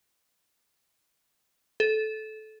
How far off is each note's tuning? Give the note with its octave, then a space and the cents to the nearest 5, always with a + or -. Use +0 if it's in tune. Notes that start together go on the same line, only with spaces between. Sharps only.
A4 -20